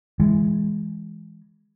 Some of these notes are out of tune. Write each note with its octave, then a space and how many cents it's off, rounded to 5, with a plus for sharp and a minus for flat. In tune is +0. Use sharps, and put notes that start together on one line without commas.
E3 +0 G#3 +0